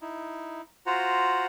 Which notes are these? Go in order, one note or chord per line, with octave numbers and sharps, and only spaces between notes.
D#4 E4
F4 F#4 C5 F#5 A#5